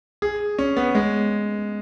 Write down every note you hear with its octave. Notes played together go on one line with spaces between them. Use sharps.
G#4
C#4
B3
G#3